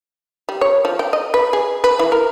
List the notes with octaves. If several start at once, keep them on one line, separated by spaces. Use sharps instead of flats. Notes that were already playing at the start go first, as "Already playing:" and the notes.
G3
C#5
F3
G5
D#5
B4
G#4
B4
E3
A#4